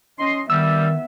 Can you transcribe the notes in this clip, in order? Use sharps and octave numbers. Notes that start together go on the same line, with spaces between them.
C#4 D#5 C6
D#3 G3 B3 E5 E6